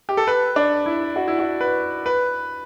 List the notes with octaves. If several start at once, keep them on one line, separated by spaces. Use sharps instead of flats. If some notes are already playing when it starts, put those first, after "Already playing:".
G4
A4
B4
D4
E4
F#4
E4
F#4
B4
B4